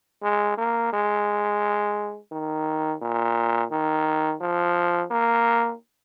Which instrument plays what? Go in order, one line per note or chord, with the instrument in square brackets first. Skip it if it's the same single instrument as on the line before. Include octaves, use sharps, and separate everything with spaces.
[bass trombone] G#3
A#3
G#3
D#3
A#2
D#3
F3
A#3